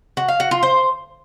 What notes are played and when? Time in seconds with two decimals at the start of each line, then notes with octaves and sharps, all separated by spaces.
0.17 F#4
0.28 F5
0.40 F#4
0.51 F4
0.63 C5